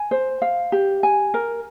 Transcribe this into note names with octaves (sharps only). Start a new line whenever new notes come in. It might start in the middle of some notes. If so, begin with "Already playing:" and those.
Already playing: G#5
C5
F5
G4
G#5
A#4